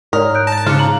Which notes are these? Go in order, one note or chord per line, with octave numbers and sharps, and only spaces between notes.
G#2 A#4 C#5 D5 D#6
F#6 G6 D7
A5 A#6 E7
G#2 C#3 F4 F5 D6 F6 F#6 C#7
A#5 F#7